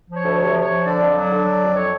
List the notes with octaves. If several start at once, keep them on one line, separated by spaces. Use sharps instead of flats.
F3
C#5
D2
C3 C#5
F3
C#5
F3
D3 D5
F2
F#3
D3
F#3
F2
C#5